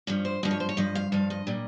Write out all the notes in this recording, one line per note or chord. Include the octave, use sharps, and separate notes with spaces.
G2 F3 C#4
C5
G2 F3 D#5
C#5
C5
C#5
G2 F3 D#5
F5
G2 F3 F5
D#5
A#2 G3